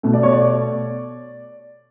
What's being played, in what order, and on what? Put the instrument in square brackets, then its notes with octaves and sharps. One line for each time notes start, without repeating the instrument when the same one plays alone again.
[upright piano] B2 A3
D5
C#5
D5